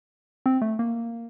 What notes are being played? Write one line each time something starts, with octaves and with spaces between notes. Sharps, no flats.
C4
A3
A#3